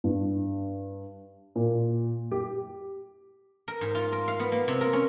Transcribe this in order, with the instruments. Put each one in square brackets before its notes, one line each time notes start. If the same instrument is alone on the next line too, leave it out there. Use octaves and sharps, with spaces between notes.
[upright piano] G2
A#2
G4
[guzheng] A#4
G#2
F4
A#4
F5
B3
A#3
C3
A#4
C#4